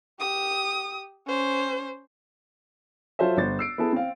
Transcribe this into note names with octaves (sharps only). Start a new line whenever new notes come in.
G4 D#6
C#4 C5
F#3 F4 A4 C5 C#5 E5
G1 C5 A6
E6 C7 D7
B3 E4 G#4 A4
C4 F5